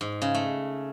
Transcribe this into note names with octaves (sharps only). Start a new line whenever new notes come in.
G#2
C#3
A3